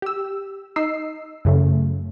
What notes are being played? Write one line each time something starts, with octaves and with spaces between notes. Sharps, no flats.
G4 E6
D#4 D#5 E6 C7
F#2 C#3 A3